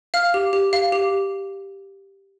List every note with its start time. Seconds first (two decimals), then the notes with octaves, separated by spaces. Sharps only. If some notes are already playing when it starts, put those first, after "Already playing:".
0.14 F5 F6
0.34 G4
0.53 G4
0.73 F5
0.92 G4